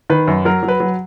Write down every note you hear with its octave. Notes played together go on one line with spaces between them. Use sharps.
D#3 B4
F#2
F#3 A#4
F#3
B4
F#3